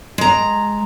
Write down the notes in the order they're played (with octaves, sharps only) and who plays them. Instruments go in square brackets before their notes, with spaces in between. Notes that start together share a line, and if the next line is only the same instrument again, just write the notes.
[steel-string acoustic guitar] G#3 A#5